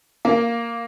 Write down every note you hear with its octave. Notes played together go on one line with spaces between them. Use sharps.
A#3